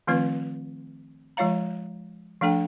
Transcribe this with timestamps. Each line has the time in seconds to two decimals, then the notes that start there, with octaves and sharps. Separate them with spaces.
0.07 D#3 F3 A3 C4 F4 B4
1.37 F3 G#3 F4 C#5 F5 A#5
2.41 F3 A3 D4 A4 G5